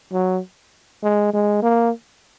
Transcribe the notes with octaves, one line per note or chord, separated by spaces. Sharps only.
F#3
G#3
G#3
A#3